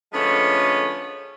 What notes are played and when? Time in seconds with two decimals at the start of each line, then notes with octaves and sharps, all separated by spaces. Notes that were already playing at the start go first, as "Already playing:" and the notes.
0.13 D3 F3 G#3 A3 B3 C#4